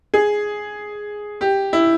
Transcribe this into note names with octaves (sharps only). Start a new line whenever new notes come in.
G#4
G4
E4